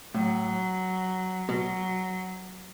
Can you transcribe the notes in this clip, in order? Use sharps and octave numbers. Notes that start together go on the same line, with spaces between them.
A2 F#3
B2 F#3